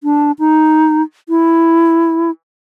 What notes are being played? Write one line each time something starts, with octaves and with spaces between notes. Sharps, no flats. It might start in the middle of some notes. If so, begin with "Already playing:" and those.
D4
D#4
E4